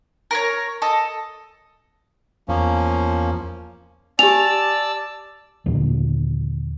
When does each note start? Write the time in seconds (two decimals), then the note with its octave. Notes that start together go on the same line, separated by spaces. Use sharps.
0.31 A#4 B4 C#5
0.82 A4 D#5
2.48 E2 F3 A#3 C#4
4.19 G4 D5 G#5 A5 E6 F7
5.66 D#2 A#2 D3 F3